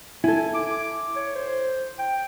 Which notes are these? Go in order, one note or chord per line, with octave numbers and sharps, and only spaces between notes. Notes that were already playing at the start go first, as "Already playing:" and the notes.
E4 A4 G#5
D6
C#5
C5
G5